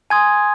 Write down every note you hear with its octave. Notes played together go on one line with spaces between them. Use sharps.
G#5 C6 D#6 G#6